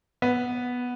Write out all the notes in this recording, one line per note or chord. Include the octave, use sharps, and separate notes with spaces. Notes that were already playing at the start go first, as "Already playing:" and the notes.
B3